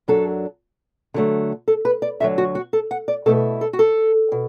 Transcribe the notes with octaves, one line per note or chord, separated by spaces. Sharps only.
F#2 F#3 D4 A4
D3 F#3 A3
A4
B4
D5
D2 D3 F#3 E5
F#4
F#4
A4
F#5
D5
B2 A3 E4 A4
A4
F#4
A4
B2